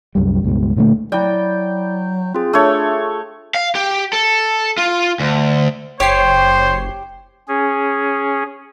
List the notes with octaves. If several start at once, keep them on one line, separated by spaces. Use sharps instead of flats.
C2 F#2 G3
C#2 G2 B2 G#3
A#2 D3 F3 A3
F#3 E4 D5 G5
C4 F4 G#4
A3 D4 C#5
F5
G4
A4
F4
D2
F#1 G4 C5 C#5 C7
C#4 G#4